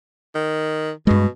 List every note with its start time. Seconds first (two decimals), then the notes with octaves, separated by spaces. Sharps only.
0.35 D#3
1.07 G2 B2 G#3